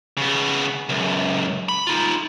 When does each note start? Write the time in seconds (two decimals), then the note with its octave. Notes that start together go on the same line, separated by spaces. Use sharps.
0.17 C#3 B3
0.89 C#2 F#2
1.69 B5
1.87 D#4 F4